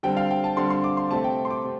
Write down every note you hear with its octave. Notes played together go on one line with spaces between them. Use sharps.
D3 G3 C4 G5
F5
G5
A5
D3 G3 C4 C6
C6
D6
C6
C3 A3 C4 A5
G5
C6
D6
C3